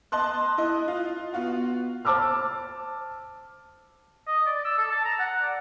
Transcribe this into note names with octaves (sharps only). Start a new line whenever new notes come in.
D#5 A5 C6 F#6
E4 D#5
F4
B3 F4 F#4
C5 A5 D6 E6 F6
D#5
D5
E6
A4
A5
A#5
F#5
D5